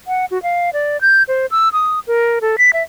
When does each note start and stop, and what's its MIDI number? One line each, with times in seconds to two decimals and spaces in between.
0.07 0.25 78
0.31 0.41 66
0.43 0.70 77
0.73 1.00 74
1.01 1.23 91
1.28 1.46 72
1.51 1.69 88
1.73 2.00 87
2.07 2.39 70
2.41 2.56 69
2.58 2.71 95
2.73 2.83 76